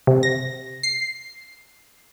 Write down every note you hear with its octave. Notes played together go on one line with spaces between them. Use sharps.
C3
A#6
C7